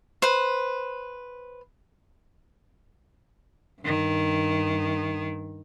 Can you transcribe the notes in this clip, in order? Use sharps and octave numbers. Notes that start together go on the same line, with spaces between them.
B4 C5
G2 D#3